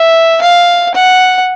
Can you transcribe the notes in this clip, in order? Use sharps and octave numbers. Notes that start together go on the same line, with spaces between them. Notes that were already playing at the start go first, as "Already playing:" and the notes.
Already playing: E5
F5
F#5